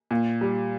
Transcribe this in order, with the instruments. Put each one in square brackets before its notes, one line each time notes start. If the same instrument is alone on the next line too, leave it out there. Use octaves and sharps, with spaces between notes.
[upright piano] A#2
G3